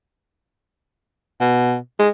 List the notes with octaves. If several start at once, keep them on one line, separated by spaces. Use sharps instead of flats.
B2
G#3